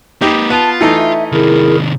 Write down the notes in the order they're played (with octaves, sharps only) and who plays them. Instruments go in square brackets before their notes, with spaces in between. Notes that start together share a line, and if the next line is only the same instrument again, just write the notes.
[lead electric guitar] A#3 B4 [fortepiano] D#4 G4
[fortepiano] B3 [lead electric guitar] F4 [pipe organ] A5
[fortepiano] E3 A3 D#4 [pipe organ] E5
[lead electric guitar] C3 D#3 [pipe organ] E4 G#4 A#4